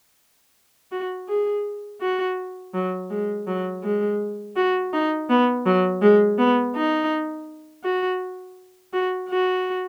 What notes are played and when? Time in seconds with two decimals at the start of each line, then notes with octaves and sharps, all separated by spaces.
0.92 F#4
1.29 G#4
2.01 F#4
2.74 F#3
3.10 G#3
3.47 F#3
3.84 G#3
4.56 F#4
4.93 D#4
5.30 B3
5.66 F#3
6.02 G#3
6.38 B3
6.76 D#4
7.84 F#4
8.93 F#4
9.30 F#4